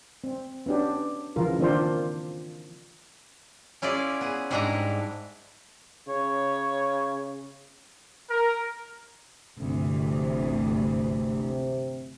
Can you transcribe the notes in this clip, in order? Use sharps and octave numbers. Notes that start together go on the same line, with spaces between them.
C4
B3 C#4 D4 G4
C#3 E3 F3 F4 A#4
D#3 A#3 C4 D4 F4 C5
C#4 E4 F4 G#4 D5
B3 G#4
G#2 G3 G#3 D4 E4 A#5
C#3 C#5
A#4
G1 D2 C3 E3